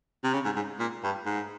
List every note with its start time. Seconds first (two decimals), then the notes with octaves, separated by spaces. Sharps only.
0.24 C3
0.34 C#3
0.45 G#2
0.56 G#2
0.79 A#2
1.03 G2
1.26 G#2